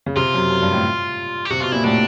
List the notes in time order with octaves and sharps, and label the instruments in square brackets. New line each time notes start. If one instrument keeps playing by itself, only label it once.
[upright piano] C#3
[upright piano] C3 [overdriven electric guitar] F4
[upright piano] F#2
F#2
G2
A2
[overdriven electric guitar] G4
[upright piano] C3 [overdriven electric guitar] F#4
[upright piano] B2 [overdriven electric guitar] F4
[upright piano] A#2 [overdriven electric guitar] E4
[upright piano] A2 [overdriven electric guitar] D4